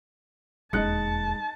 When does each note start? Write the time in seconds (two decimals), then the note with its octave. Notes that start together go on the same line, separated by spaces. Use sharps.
0.73 D#1 E2 G#3 D#4 A5 F#6 C#7